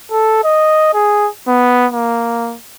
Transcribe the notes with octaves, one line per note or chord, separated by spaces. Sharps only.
A4
D#5
G#4
B3
A#3